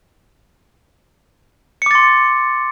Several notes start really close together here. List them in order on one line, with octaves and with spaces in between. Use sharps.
C#7 D6 A6 C6